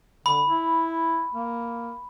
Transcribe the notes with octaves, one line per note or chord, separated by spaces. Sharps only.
D3 B5
E4
A#3